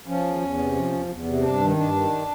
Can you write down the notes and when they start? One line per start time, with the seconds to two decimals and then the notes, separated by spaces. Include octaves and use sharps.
0.07 F3 C#4
0.25 E2
0.41 E2
0.58 C3
0.75 F3
0.92 E2
1.08 E2
1.25 C3
1.42 G2 D4
1.60 D#3
1.77 G2 D4
1.93 D#3